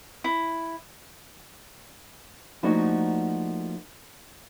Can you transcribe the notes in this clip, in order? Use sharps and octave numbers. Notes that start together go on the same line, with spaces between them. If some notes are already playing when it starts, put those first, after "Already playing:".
E4
F3 A3 A#3 D4 D#4 F#4